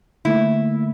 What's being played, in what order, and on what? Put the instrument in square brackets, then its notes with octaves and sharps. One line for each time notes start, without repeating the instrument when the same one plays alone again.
[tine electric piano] D3 A3 A#3 [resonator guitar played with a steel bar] E4